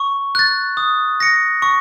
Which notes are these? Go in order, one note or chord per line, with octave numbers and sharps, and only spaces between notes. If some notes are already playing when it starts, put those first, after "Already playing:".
Already playing: C#6
F#6 A6
D#6
A#6 C#7
C#6